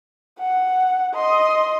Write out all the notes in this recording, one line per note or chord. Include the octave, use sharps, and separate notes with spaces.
F#5
D#5 C6